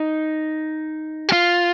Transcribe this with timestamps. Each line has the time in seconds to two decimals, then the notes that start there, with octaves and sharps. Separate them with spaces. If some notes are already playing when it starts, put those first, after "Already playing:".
Already playing: D#4
1.29 G4
1.32 F4